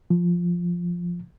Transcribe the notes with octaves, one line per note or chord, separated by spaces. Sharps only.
F3